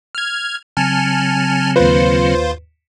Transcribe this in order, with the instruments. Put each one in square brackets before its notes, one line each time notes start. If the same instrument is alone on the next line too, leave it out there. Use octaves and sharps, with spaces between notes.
[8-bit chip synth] F6 G#6
[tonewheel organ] C#3 F#3 C4 [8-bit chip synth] G#5 A5 F6
[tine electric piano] D#2 B4 [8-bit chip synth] F4 C5